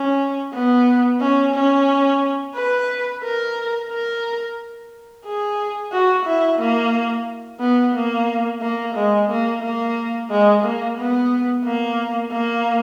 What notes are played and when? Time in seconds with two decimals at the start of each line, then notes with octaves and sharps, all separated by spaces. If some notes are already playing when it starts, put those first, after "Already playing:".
Already playing: C#4
0.53 B3
1.21 C#4
1.54 C#4
2.55 B4
3.23 A#4
3.90 A#4
5.25 G#4
5.92 F#4
6.26 E4
6.59 A#3
7.60 B3
7.95 A#3
8.61 A#3
8.95 G#3
9.30 A#3
9.63 A#3
10.30 G#3
10.64 A#3
10.98 B3
11.65 A#3
12.32 A#3